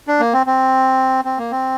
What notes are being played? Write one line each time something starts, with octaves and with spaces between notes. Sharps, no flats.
D4
A#3
C4
C4
C4
A#3
C4